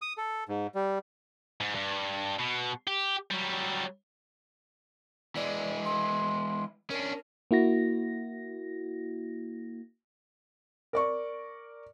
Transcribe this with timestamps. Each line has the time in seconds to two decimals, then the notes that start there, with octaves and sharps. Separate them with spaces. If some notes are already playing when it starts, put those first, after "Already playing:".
0.02 D#6
0.17 A4
0.49 G#2
0.75 G3
1.60 G#2
1.75 G2
2.39 B2
2.87 G4
3.30 F#3 G3
5.36 E3 G#3 D5
5.85 C6
6.90 C#4 D4 A#4
7.51 A#3 E4 F#4 A#6
10.93 A#4 D5 C#6